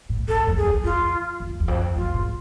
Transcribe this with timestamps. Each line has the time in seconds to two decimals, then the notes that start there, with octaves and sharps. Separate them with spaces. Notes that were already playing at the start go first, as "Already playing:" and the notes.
0.09 A2
0.28 G#2 A4
0.47 F2
0.57 G#4
0.66 E2
0.84 F2 F4
1.40 F2
1.60 E2
1.68 F2
1.96 F2 F4
2.14 G#2